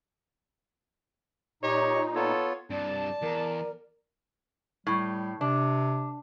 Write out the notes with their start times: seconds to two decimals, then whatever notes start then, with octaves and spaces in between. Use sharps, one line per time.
1.63 A#2 D#4 G4 C#5 D#5
2.15 B3 F4 A4 C#5
2.71 G2 C3 D5 A5
3.22 E2 A#4
4.87 A2 G3
5.41 C3 D4